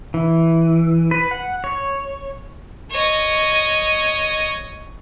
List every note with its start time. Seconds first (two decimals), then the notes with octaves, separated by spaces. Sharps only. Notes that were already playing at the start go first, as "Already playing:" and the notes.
0.14 E3
1.11 B4
1.31 F#5
1.64 C#5
2.91 C#5 D#5